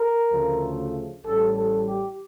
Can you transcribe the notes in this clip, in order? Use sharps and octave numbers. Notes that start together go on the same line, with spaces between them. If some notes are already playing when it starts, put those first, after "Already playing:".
Already playing: A#4
D2 C#3 F3 A3
A1 A2 G3 A4
A4
G4